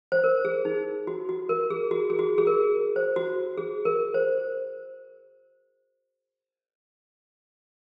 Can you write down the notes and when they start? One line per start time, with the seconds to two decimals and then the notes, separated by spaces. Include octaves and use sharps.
0.12 C5
0.24 A#4
0.45 G#4
0.65 D#4
1.07 F#4
1.29 F#4
1.49 A#4
1.70 G#4
1.91 F#4
2.10 G#4
2.19 F#4
2.38 G#4
2.47 A#4
2.96 C5
3.16 F#4
3.57 G#4
3.85 A#4
4.14 C5